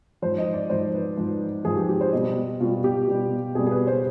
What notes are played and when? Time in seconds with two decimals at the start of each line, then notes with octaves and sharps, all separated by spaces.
0.22 G#2 F3 C5
0.38 D#5
0.54 D5
0.70 G#2 F3 C5
0.94 B4
1.17 G#2 F3
1.65 G#2 F3 G#4
1.77 G4
1.89 G4
2.01 C5
2.13 B2 G3 D#5
2.60 B2 G3 F4
2.84 G4
3.08 B2 G3
3.55 B2 G3 G#4
3.67 G#4
3.71 B4
3.87 C5